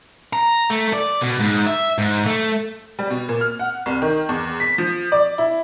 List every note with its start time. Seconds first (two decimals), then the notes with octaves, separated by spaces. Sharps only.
0.33 A#5
0.70 A3
0.93 D5
1.22 B2
1.40 G#2
1.66 E5
1.98 G#2
2.26 A3
2.99 G3
3.10 B2
3.29 A#2
3.41 F6
3.59 F#5
3.86 C2
4.02 D#3
4.29 E2
4.60 B6
4.78 F3
5.12 D5
5.38 E4